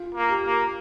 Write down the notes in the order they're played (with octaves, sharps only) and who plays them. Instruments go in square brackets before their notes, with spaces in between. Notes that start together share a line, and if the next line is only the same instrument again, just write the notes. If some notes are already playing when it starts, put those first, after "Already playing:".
Already playing: [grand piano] F4
[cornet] A#3
[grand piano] G4
[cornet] A#3